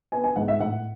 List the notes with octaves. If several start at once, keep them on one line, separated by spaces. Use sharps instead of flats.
B3 G#5
G#5
G#2 F#5
E5
A2 F#5